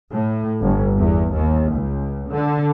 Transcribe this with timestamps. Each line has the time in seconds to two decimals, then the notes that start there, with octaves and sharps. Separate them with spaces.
0.12 A2
0.61 G1
0.97 E2
1.32 D#2
1.73 C#2
2.30 D3